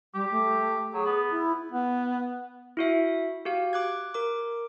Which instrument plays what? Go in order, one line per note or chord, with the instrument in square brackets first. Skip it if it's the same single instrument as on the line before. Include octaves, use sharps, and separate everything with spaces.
[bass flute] G3 [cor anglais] G4
[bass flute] A3
[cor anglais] F#3 [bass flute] G#4
[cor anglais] B3
[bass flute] E4
[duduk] B3
[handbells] E4 F#4 E5
F#4 G4 F5
D6 F#6 G#6
A#4 D6